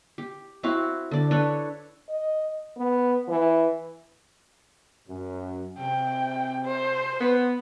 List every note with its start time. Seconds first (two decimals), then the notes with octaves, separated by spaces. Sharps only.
0.18 G4
0.63 C4 E4 F#4 F5
1.11 D3 D5
1.31 D4 A4 B4 C#5
2.10 D#5
2.77 B3
3.29 E3
5.08 F#2
5.78 C3 G5
6.65 C5
7.20 B3